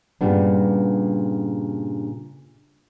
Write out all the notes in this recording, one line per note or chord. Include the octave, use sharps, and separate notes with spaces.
G2 A#2 C#3 G3 B3 D4